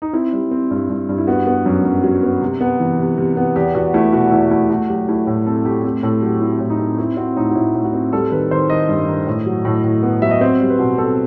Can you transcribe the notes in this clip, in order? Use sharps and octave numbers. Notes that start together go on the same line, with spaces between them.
D#4
C4 E4
G3
C4
G2
G2
G2
E4
B3 F#4
B3
F#2
F#2
F#3
B3
C3
B3
E3
C3
C3
B3
E2 G4
E2 F#4
A3 E4
B2 F#4
E2 E4
A3 E4
A3 F#4
F#3 G4
A3 E4
A2 F#4
C4 A4
A3 G4
C4 G4
A2 A4
F#3 G4
C4 E4
A2
D#4
C4
C4 E4
C4 F#4
A2 D#4
F#4
A2 E4
A2
F#4
C4
G3 A4
D#3 B4
D#3 C5
D#3 D#5
G2
D#3
A2
F#3
A2
A2
B3
F#3 E5
D#5
C4 C5
G3
B4
B2
C4 A4